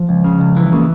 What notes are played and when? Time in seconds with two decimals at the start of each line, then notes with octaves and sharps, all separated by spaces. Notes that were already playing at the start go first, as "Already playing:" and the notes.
Already playing: F3
0.09 C#2
0.24 C#3
0.40 C#2
0.56 E3
0.72 C#3 A#3